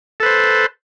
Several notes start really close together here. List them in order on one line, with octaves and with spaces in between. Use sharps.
A4 B4 C5